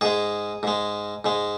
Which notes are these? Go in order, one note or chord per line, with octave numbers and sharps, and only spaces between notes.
G#2 G#3 G#4
G#2 G#3
G#2 G#3